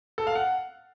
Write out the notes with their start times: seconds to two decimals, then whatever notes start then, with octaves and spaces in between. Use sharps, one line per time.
0.18 A4
0.27 F5
0.35 F#5